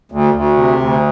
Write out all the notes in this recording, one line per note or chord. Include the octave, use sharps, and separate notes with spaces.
D2
D2
C3
D2